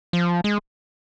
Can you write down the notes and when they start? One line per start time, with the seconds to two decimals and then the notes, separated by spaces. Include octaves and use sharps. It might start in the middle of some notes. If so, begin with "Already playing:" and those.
0.13 F3
0.44 G#3